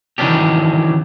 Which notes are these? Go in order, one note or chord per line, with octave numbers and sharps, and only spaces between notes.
D#3 E3 F#3 C#4 D4 G4